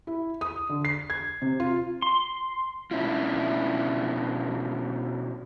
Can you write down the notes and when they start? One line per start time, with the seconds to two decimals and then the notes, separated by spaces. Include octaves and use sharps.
0.07 E4
0.41 D#6
0.69 D3
0.85 C7
1.10 G#6
1.42 C3
1.60 F4
2.02 C6
2.91 B2 C#4 D4 E4 F4